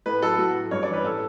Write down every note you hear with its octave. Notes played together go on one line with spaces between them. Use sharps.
A2 B4
F#3 A4
A2 F#4
F#3
G2 C#5
E3 D5
B4
A2 A4